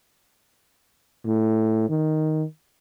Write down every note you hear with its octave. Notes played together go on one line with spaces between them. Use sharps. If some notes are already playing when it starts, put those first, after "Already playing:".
A2
D#3